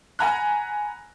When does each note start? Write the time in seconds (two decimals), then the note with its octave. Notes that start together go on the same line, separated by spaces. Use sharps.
0.19 F#5 G#5 A#5 B5 F#6